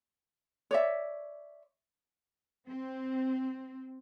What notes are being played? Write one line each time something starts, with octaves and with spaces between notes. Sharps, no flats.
C#5 D5 E5
C4